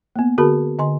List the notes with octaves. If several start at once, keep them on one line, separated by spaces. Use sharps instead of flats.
A#3 B3
D3 F#4 G#4 A#4 A5 B5
D3 D#5 G#5 C6